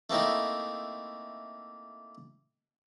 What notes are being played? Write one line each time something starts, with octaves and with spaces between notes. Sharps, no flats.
A3 A#3 C4 D#4 E4